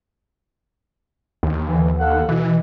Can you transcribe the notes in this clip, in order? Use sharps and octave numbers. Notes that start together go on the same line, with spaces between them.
D#2
D3 E3
A4 F5 F#5
B2 E3